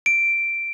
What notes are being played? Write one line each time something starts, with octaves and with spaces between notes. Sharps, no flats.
D7